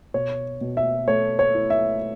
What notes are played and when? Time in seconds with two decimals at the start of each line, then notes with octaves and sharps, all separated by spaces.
0.14 B2 C#5
0.61 B2
0.77 E5
1.07 A3 C#5
1.39 C#5
1.54 E4
1.70 E5